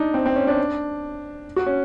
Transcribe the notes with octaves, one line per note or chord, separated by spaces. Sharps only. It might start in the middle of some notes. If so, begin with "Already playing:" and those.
Already playing: D4 D#4
C4
C4
C#4
D4
F#4
C#4